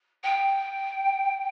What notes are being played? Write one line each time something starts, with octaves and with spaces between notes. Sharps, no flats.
G5